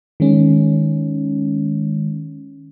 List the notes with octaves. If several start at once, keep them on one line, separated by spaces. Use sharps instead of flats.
D#3 G#3 C#4